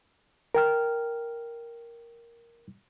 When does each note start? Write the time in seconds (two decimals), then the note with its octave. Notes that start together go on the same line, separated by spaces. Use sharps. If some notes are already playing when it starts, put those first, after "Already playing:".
0.55 A#4 G5 F6